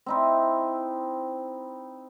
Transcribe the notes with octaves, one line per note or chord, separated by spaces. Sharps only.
C4 D#4 E4